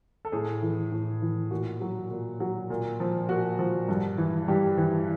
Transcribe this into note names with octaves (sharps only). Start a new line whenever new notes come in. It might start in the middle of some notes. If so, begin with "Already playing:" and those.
A4
A2 G#4
E3
A2
E3
A#2 F#4
F#3
A#2
F#3
A#2
F3
A#2 F#4
F3
G2
E3
G2 G4
E3